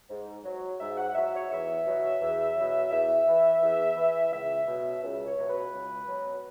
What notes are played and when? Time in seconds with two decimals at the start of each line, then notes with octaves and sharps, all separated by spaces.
0.10 G#2
0.44 F#3
0.80 G#2 E5
0.97 F#5
1.15 F#3 E5
1.33 C#5
1.50 E2 E5
1.86 B2 F#3
2.21 E2
2.56 B2 F#3
2.91 E2 E5
3.27 E3
3.61 E2
3.96 E3
4.32 C#2 E5
4.67 B2 F#3
5.02 C#2
5.25 C#5
5.37 B2 F#3
5.48 B4
5.72 C#2
6.08 B2 F#3